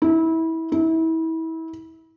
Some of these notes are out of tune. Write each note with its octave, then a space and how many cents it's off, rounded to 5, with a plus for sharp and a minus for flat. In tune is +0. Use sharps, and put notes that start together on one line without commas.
E4 -25
E4 -30